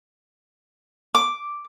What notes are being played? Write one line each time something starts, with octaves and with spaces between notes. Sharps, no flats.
D6